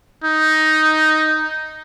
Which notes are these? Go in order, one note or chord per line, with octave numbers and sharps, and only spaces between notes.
D#4